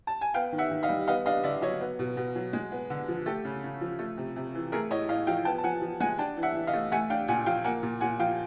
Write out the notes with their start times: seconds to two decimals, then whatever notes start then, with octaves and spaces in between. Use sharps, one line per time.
0.07 A5
0.21 G#5
0.34 B3 F5 G5
0.53 D#3
0.58 E5 F#5
0.71 D#3
0.83 D#5 F5
0.89 G3
1.07 B3 D#5 F5
1.26 D4 D#5 F5
1.43 D3 D5 E5
1.62 F#3 C#5 D#5
1.80 B3
1.99 B2
2.17 B2
2.35 F#3
2.53 G#3
2.72 B3
2.90 D3
3.08 F3
3.26 A3 G4 A4
3.45 C#3
3.63 C#3
3.81 F3
3.99 A3
4.17 C3
4.36 C3
4.54 E3
4.72 A3 G#4 A#4
4.91 A2 C#5 D#5
5.09 A2 D#5 F5
5.27 F3 F5 G5
5.45 B3 G5 A5
5.58 A5
5.64 F3 F#5 G#5
5.82 F3
6.00 G#3 F#5 G#5
6.18 D4 G5 A5
6.37 E3
6.43 E5 F#5
6.55 E3
6.67 D#5 F5
6.73 A3
6.92 A3 F#5 G#5
7.10 D4 F5 G5
7.28 A#2 F#5 G#5
7.46 F3 F5 G5
7.64 A#3 F#5 G#5
7.83 A#2
8.01 A#2 F#5 G#5
8.19 F3 F5 G5